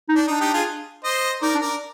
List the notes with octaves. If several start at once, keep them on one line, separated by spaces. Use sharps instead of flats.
D#4
D4
D4 D#4
D#4 G4
F4 G#4
C5 D#5
D#4 A#4 D5
D4
A#4 D5